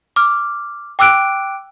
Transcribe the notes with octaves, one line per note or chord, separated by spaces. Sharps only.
D6 F6
G5 D6 E6 F#6 D7